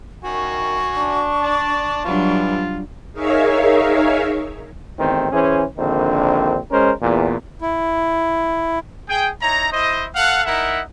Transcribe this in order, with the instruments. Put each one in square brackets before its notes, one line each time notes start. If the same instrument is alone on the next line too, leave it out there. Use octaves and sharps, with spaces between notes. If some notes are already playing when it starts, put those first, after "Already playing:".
[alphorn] D#3 [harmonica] F#4 G#5 [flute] C#6
[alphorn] D4
[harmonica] D5 A5
[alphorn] E3 [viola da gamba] F#3 G3 D4 [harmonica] F4
[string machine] D#4 G#4 A#4 C#5 E5 F5
[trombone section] A1 E2 D#3 C4
E3 C#4 G#4 C5
A#1 D3 D#3 C4
G#3 C#4 A#4 C5
E2 A#2
[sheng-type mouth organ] E4
[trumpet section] G#4 G5
D#4 E4 C#5 A#5
E4 C5 D#5
A4 F5 F#5
D#4 E4 A#4 E5 F#5